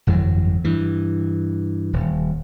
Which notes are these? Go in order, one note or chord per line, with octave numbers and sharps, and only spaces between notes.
G1 F2 E3 F#3
G2 E3
D#1